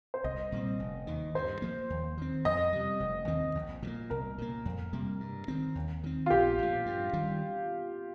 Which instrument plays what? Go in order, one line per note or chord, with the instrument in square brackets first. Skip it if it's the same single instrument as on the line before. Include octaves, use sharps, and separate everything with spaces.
[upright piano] C5
[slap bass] C2 [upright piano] D#5
[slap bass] A#2 G3 C4
F1
D#2 D#3
[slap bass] G2 [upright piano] C5
[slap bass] F3 A#3
D#2
D#3 C4
[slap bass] F2 [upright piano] D#5
[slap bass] C3 G3
F1
D#2 D#3 C4
A#1
A#2 G3
A#3
[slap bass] C2 [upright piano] A#4
[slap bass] A#2 A#3
F2
C3 G3 A#3
G2
D#3 C4
D#2
D#3 C4
[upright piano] F4
[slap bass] A#1 [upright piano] G4
[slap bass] A#2 F3
G2
D#3 G3